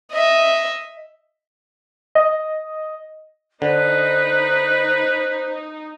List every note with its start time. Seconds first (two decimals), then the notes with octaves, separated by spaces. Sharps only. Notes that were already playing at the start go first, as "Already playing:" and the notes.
0.12 D#5 E5
2.15 D#5
3.62 D3 D#4 B4 C5